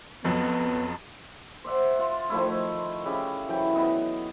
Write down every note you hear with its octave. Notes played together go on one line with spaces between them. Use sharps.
F2 F3 F#3 B3
C5 D5 E5 F#5
F4
D#3 F3 A3 E4
C#3 E4 G4
E3 F#3 G5
B3 D#5